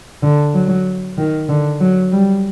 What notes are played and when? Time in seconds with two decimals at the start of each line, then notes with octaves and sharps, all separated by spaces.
0.23 D3
0.54 F#3
1.17 D#3
1.49 D3
1.80 F#3
2.12 G3